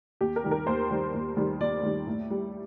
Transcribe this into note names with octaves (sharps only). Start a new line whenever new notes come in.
D#2 G4
A#4
D#3 G3
A#4
D#2 C5
D#3 G3
D#2
D#3 G3
D#2 D5
D#3 G3
A2
G3